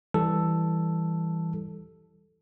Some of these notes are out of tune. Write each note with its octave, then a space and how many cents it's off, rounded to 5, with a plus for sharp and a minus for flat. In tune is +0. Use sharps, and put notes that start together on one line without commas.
E3 -5 G3 +0 A4 +0